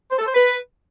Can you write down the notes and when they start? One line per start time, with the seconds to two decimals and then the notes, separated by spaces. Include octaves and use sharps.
0.11 C5
0.19 A4
0.27 C5
0.34 B4